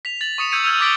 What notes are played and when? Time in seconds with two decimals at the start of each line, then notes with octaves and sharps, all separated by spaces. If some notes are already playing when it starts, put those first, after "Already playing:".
0.05 B6 F7
0.21 A6 F#7
0.38 C#6 D#6 C#7 E7
0.52 E6 G6 G#6 C#7 D#7
0.64 E6 F6 G6 G#6
0.80 D6 A6 B6 D7 F#7 G7